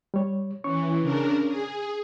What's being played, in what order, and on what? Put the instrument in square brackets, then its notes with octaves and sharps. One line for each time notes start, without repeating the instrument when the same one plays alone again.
[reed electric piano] G3 C#5
[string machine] E3 [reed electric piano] C#4 C#5 C#6
[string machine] C#3 D4 A#4
G#4